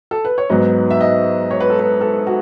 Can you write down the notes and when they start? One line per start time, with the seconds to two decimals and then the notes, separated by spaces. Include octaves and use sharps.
0.11 A4
0.25 B4
0.38 C#5
0.50 G#2 F#3 B3 D#5
0.90 E5
1.01 D#5
1.51 C#5
1.60 B4
1.70 A4
1.79 B4
2.01 A4
2.27 F#4